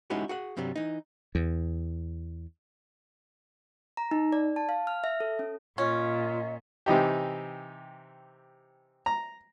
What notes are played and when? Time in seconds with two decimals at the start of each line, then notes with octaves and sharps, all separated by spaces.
0.10 G#3 C#4 D#4 E4 F#4 G4
0.29 F#4 G#4 F#5
0.57 G2 C3 F#3 G3
0.76 E3 D#4
1.35 E2
3.97 A#5
4.11 D#4
4.32 D5
4.56 A5
4.69 F5
4.87 F6
5.04 E5
5.20 A4
5.39 C#4
5.78 A#2 C#4 F4 D#5
6.86 C3 E3 D#4 G4
9.06 A#5